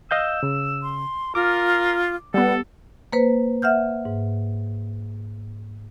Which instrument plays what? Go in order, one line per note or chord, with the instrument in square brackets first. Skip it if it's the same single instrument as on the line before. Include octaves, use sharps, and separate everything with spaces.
[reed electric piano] D#5 F5 G6 [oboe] E6
[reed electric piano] C#3
[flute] C6
[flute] F4 [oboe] A#4 [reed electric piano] D6
[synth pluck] G3 B3 [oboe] A4 [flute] F#5
[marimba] A#3 B4 C5
E5 F#5 F6 G6
G#2